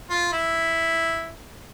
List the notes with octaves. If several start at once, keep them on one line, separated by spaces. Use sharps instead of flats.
F4
E4